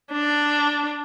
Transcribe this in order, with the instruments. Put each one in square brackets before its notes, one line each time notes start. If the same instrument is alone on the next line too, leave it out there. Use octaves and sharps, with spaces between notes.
[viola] D4